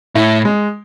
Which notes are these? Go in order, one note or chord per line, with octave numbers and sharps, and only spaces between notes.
A2 E4
G#3